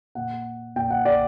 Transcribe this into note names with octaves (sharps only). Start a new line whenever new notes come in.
A#2 F#5
A#2 G5
F#5
D5